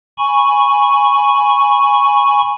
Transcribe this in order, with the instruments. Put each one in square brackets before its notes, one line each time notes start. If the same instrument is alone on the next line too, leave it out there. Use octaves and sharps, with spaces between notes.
[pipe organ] G#5 B5 C#6